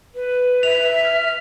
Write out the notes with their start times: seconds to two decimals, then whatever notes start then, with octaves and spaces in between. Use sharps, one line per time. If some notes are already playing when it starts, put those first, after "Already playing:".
0.15 B4
0.63 E5 F7
1.04 F6